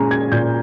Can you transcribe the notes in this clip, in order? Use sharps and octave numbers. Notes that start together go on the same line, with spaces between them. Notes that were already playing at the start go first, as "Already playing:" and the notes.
Already playing: A#2 G#3 C#4 G#5 A#5
G#6
A#2 G6